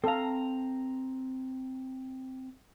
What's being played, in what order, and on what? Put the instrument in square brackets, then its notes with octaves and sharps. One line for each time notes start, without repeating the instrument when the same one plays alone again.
[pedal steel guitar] C4 A#5 [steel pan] A4 F5